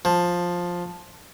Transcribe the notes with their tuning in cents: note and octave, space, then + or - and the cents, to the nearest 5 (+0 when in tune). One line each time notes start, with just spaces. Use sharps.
F3 +10